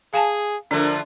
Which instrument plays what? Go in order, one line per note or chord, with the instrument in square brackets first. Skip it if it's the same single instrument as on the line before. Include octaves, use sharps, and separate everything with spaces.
[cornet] G#4 [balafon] F5 G#5 A5
[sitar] D3 F3 A3 [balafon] D4 [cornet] A#4